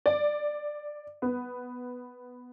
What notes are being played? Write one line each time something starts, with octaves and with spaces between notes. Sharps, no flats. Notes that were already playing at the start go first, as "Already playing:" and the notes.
D5
B3